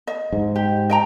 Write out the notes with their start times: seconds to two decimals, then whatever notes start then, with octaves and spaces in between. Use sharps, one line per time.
0.07 D#5
0.33 G#2
0.56 G4
0.90 D#5 G5 A#5